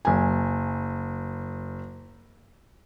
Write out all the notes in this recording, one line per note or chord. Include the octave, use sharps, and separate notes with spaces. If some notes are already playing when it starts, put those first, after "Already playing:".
F#1 G#5